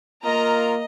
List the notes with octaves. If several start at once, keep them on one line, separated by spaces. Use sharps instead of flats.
A#3 F4 A#4 D#5 A#5